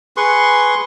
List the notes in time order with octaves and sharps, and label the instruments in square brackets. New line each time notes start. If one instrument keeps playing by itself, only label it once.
[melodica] G#4 B4 C6 C#6